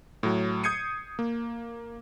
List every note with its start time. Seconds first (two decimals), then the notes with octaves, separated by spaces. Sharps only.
0.23 A2 F#3
0.64 D#6 G6 G#6 C7 C#7 D#7
1.19 A#3